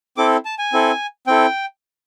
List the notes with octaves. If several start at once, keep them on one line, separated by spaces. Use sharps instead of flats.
C4 E4 A4 D6
A5
G#5
C4 E4 A4
C4 E4 A4 G5